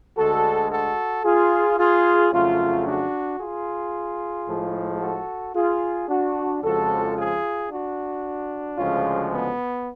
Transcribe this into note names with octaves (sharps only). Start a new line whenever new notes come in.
D2 D3 G#3 F#4 A4
F#4 A4
F4 G#4
F4 G#4
F2 C#3 F#3 A3 C#4 F4
D4 F#4
F4 G#4
A2 F3 G#3
F#4 A4
F4 G#4
D4 F#4
F2 C#3 F3 G#3 F#4 A4
F4 G#4
D4 F#4
D2 C#3 F3 G#3 C#4 F4
B3